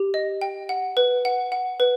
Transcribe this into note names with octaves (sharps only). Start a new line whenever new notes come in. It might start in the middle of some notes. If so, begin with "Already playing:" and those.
Already playing: G4
D#5
G5
F#5
B4
F#5
F#5
B4